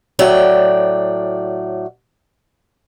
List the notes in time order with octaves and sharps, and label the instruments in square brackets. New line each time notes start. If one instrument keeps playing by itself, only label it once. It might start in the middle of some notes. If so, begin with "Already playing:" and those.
[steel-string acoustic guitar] A2 F#3 D5 G5